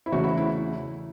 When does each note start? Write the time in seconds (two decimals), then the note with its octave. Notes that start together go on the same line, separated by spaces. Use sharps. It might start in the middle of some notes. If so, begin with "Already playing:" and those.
0.06 E4
0.12 E2 C#3 A3 C#4 F#4
0.24 E4
0.37 E4